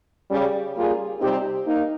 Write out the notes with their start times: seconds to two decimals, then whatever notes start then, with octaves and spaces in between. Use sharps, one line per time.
0.31 C#3 G3 C#4
0.76 G3 A#3 F4 G#4
1.21 C3 G3 C4 D#4 G4
1.67 A#3 D#4